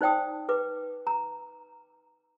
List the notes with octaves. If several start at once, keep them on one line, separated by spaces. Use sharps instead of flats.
D#4 C5 D5 G5 A5 D#6
B4 D6
A#5